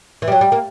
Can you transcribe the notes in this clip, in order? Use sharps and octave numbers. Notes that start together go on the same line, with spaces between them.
E3
G3
F#3
G3
A#3